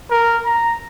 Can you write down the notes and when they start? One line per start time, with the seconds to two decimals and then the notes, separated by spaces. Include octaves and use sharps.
0.11 A#4
0.45 A#5